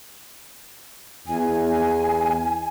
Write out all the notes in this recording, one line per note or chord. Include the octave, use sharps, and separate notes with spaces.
E2 G#5